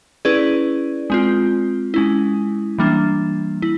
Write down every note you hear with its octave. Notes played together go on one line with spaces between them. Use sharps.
C#4 E4 G#4 B4 D5
G#3 C4 F4
G#3 C#4 E4
E3 G3 A#3 D4
E4